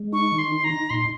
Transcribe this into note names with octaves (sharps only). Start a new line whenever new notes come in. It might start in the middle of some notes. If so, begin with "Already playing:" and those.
Already playing: G#3
D#4 C#6
D#3
C6
D#4
A#5
D#4
A#2 C6